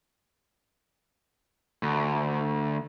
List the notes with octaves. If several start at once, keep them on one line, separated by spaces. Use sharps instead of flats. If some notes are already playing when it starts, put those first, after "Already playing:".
D2